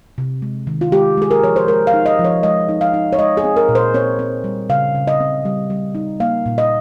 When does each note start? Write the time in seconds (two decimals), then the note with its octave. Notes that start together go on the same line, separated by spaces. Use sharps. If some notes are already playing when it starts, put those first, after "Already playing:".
0.18 C3
0.42 G#3
0.67 D#3
0.81 F4
0.92 G#3 G4
1.17 G#3 G#4
1.31 A#4
1.42 F3 C#5
1.56 C5
1.68 G#3 A#4
1.87 F5
1.94 D#4
2.06 D#5
2.19 F3
2.24 C#5
2.43 G#3 D#5
2.69 D#4
2.81 F5
2.94 D#4
3.13 C#5
3.19 G#3 D#5
3.37 G#4
3.44 C4
3.56 A#4
3.69 A#2
3.75 C5
3.94 C4 C#5
4.19 C4
4.44 G3
4.69 C#3 F5
4.95 C#3
5.07 D#5
5.20 C4
5.45 G3
5.70 G3
5.95 D#4
6.20 A#3 F5
6.46 A#2
6.58 D#5